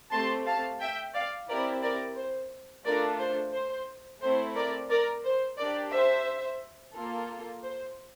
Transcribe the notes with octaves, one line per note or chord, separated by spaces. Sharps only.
A3 C4 G4 A5 C6
F5 A5
E5 G5
D5 F5
C4 E4 G4 A#4 D5
A#4 D5
C5
A3 D4 F4 A4 A#4 D5
C5
C5
A3 C4 E4 C5
A#4 D5
A#4 D5
C5
D4 G4 A#4 D5
C5 E5
A#3 F4 A4
C5